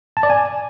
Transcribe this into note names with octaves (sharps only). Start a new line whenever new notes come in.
A5
D5
G#5